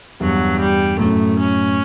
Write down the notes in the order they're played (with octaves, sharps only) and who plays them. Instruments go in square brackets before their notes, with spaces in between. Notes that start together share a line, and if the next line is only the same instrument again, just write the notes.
[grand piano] E2 G2 [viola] F#3
[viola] G3
[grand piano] F#2 A2 [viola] A3
[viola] C#4